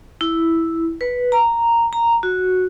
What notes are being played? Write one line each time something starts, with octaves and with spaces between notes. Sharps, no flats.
E4
B4
A#5
A#5
F#4